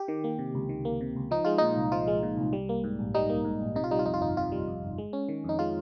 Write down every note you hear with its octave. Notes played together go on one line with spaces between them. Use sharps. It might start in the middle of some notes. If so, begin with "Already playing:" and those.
Already playing: G4
D#3
A#3
C3
C#2
D#3
A#3
C3
C#2
F3 D#4
G#3 F4
A#2 D#4
C2
F3 F4
G#3
A#2
C2
G3
A#3
G#2
A#1
G3 D#4
A#3
G#2
A#1
C3 D#4
F4
G3 D#4
F4
F2 D#4
F4
G1 D#4
C3 F4
G3
F2
G1
G#3
C#4
D#3
F2 D#4
G#3 F4